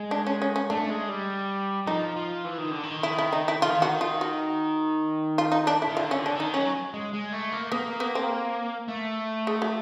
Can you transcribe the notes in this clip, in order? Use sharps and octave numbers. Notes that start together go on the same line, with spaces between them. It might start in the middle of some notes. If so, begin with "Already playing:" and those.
Already playing: G#3
D4
C#4
C#4
C#4
A3 D4
G#3
G3
F3 D#4
F3
E3
D#3
D3
D#3
E4
E4
D#4
E4
D#3 F4
E3
D#3 F#4
F4
F#4
F4
D#4
D4
E4
D#3
D3 F4
C#4
D3
D4
D#3 D#4
F#3 C#4
G#3
G#3
A3
A#3
A#3 B3
B3
C4
A3
G#3
F#3